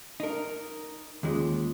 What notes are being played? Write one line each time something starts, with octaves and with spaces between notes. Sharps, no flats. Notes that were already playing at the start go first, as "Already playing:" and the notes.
D#4 A#4
D#2 G#3 C#4 F4 G#4